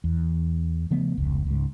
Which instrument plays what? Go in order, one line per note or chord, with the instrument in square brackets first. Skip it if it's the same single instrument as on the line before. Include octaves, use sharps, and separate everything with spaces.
[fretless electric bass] E2
C#3 F3 A3 B3
F1 C#2
C#2 G#2